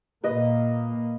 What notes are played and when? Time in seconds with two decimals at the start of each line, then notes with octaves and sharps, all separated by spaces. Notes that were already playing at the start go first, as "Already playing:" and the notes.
0.24 A#2 A#3 B4 D#5